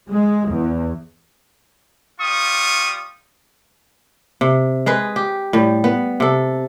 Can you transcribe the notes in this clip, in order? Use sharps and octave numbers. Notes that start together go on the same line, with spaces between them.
G#3
E2
G3 F4 C#6 D#6
C3
G#3 G#4 B4
G4
A2 G3
B3
C3 A4